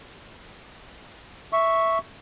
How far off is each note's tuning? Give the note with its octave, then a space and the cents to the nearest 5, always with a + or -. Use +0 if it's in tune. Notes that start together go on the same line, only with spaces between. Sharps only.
E5 +0 C#6 +0